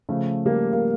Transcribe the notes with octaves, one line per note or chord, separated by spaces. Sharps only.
C#3 F3 A3
G3 A#3
A#3